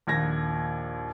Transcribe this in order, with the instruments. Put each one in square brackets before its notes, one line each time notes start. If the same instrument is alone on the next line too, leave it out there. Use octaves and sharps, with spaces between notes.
[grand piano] A#1 D#2 G#6 A#6